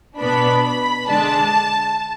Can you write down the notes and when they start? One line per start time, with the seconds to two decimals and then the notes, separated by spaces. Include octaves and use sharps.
0.18 B2 B3 D4 B5
0.63 B5
1.07 D3 G#3 D4 A5